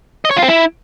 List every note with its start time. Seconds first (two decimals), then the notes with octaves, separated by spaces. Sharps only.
0.25 D#5
0.31 C#5
0.37 F4
0.42 C4
0.48 E4